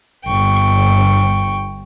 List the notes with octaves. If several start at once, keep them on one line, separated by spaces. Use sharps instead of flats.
G1 G5 C#6